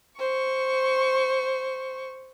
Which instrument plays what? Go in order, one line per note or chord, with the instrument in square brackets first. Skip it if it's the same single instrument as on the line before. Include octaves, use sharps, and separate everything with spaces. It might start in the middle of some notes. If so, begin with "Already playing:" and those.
[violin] C5 C#6